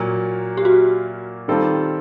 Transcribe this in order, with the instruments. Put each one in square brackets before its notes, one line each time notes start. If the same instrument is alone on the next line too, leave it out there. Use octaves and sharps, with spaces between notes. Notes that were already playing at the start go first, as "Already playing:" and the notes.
Already playing: [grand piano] A#2 F#3 A#3
[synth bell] G4
F#4
[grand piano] D#3 G3 C4 F4 A4